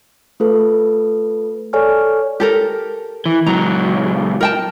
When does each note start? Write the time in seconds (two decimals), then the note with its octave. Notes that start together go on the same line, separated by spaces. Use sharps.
0.40 A3 F4 A4 B4
1.73 A4 C#5 D5 G#5 C#6 F6
2.40 G4 A4 A#4
3.26 E3
3.46 C#2 F#3 A#5
4.41 A#4 G5 A5